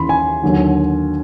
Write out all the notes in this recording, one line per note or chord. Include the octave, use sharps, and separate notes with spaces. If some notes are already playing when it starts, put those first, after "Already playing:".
Already playing: D#2 C#3 E3 B5 C6
G#5
D#2 D3 F#3